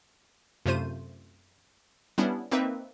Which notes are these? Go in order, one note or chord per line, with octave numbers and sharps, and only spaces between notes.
F#2 C3 A3 F4 C5 D#7
G3 B3 C#4 D4 E4
A#3 C4 D#4 B4 E5